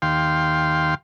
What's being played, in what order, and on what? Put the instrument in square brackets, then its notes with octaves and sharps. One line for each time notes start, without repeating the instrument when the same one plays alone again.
[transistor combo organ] D#2 F5 G5 C6